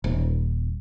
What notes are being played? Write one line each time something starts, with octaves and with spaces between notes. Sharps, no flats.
D#1